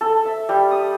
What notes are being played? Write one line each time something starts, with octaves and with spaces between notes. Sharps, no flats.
A4
E5
G3
D#6